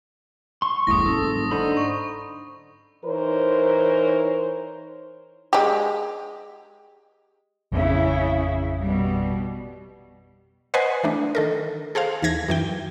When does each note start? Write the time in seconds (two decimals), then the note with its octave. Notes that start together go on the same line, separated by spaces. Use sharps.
0.62 C6 C#6
0.87 G1 E2 A2 D#6 A#6
1.06 F#1 G#2 A4
1.51 D3 D#4 C5 B5
1.77 C#6
3.05 E3 D#4 A#4 C5 C#5
5.53 G#3 G4
7.72 A1 F2 C#3 E4
8.81 B2 G3
10.74 B4 C5 D#5 F#5 G#5 C6
11.04 E3 A3 D4
11.35 D#3 A4 A#4
11.95 G#4 A4 C5 F5
12.23 D#2 E3 G#6 A#6
12.48 F#2 E3 G5